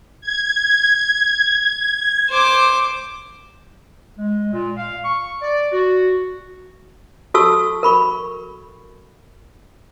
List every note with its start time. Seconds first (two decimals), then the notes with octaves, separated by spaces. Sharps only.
0.21 G#6
2.30 C5 D6
4.18 G#3
4.52 A#2
4.77 F5
5.04 C#6
5.41 D5
5.73 F#4
7.34 F#4 A4 A5 C#6 E6
7.83 A#4 B5 C#6